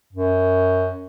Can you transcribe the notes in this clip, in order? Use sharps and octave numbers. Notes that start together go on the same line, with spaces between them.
F#2